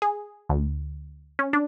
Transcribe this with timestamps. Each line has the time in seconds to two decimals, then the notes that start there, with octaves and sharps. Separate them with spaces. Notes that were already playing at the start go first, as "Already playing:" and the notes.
0.02 G#4
0.49 D2
1.39 C#4
1.53 D4